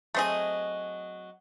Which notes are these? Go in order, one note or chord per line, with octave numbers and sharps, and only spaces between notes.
F#3 A3 C4 G#4 D#5